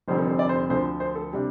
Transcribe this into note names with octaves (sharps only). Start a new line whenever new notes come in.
F1 F2 D3 G3 C4 C5
A4
C5
D5
C5
D2 D3 F3 C5
C5
A4
C3 G3 D4